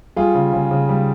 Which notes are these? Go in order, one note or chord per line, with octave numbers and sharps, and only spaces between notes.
G3 F4 G#4
C#3
C#3
C#3
G3